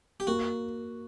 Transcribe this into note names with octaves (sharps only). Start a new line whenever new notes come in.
G4
A#3 F#4